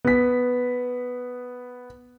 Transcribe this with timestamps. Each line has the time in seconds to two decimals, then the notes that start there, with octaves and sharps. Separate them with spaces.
0.05 B3 B6